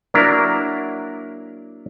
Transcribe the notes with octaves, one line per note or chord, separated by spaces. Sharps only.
F#3 A#3 D4 E4 A#4